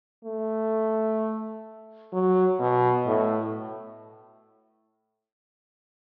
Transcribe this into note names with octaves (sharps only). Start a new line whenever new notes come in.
A3
F#3
B2
A2